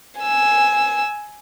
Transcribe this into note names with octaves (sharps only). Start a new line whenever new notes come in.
G#5 E6